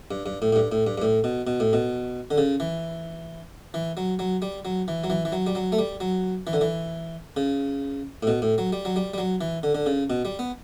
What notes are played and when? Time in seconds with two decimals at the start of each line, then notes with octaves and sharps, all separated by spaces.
0.11 G2
0.26 G2
0.42 A2
0.53 A2
0.56 G2
0.72 A2
0.87 G2
0.98 G2
1.02 A2
1.24 B2
1.47 B2
1.60 A2
1.73 B2
2.31 D3
2.38 C#3
2.60 E3
3.74 E3
3.97 F#3
4.19 F#3
4.42 G3
4.65 F#3
4.88 E3
5.04 F#3
5.10 E3
5.25 E3
5.32 F#3
5.47 G3
5.55 F#3
5.72 A3
5.79 G3
6.00 F#3
6.47 E3
6.53 D3
6.61 E3
7.37 C#3
8.23 A2
8.27 B2
8.42 A2
8.58 F#3
8.72 G3
8.85 F#3
8.96 G3
9.14 G3
9.18 F#3
9.41 E3
9.63 D3
9.75 D3
9.86 C#3
10.10 B2
10.25 G3
10.39 B3